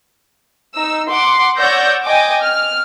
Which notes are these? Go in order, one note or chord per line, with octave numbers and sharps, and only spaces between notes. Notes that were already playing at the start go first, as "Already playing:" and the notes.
D#4 E6
F#5 C6 D6
C#5 D5 F#5 E6 G6 A#6
D#5 G5 G#5 D6
F6